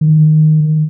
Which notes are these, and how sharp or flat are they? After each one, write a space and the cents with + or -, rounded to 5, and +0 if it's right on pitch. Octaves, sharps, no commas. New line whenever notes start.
D#3 -5